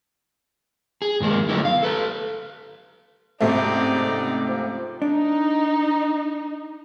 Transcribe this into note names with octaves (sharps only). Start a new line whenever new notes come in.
G#4
G2 D#3 G#3 A#3
D3 F#3 A3 B3 D#4 E4
F5
A4 B4
C#2 G#2 C3 A3 C4 D#4 D5
F3
D4 D#4